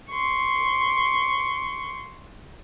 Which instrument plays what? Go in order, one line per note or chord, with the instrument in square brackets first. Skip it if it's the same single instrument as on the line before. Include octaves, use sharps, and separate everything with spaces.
[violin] C6 C#6